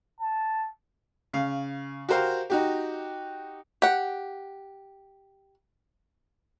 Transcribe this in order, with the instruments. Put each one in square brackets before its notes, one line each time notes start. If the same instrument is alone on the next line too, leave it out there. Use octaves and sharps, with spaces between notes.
[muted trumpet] A5
[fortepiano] C#3 F5
F#4 G4 A#4 C5 F5
D#4 F#4 G4
[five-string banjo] G4 F#5